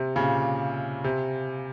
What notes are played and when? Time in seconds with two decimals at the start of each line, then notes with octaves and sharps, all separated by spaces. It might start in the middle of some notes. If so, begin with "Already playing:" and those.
Already playing: C3
0.16 A#2 C#3
1.04 C3